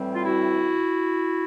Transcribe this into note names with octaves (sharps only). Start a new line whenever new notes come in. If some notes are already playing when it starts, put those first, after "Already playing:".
Already playing: A2 E3 G3 C4
F4
E4 F#4